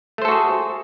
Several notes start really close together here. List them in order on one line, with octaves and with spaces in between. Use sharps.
A3 C5 A4 F#4 G#4